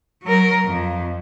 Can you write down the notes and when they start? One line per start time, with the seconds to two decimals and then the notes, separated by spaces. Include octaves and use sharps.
0.23 F#3 A#4
0.65 F2